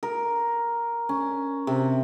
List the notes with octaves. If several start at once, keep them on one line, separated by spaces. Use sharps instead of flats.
A#4
C#4
C3